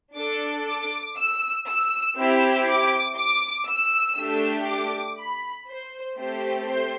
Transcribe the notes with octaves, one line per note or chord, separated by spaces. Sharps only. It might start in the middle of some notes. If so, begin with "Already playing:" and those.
D4 A4 D6
D6
E6
E6
C4 E4 G4 E6
D6
D6
E6
A3 D4 G4
D6
B5
C5
A3 C4 G4 C5
C5